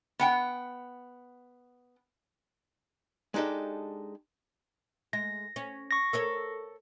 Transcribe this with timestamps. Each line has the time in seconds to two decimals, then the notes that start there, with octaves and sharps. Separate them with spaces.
0.19 B3 F#5 G5
3.34 G#3 D4 D#4 G4 A4
5.13 G#3 A#6
5.56 C#4
5.91 C#6 A#6
6.13 A4 A#4 C#5